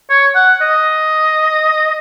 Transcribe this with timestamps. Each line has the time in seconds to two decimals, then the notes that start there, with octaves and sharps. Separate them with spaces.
0.10 C#5
0.35 F#5
0.62 D#5